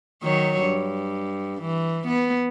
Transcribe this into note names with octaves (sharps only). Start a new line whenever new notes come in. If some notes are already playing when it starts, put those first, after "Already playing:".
D#3 F#3 C#5
G2
E3
B3